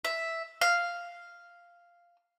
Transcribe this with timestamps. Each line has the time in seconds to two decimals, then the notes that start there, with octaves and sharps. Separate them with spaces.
0.05 E5
0.61 F5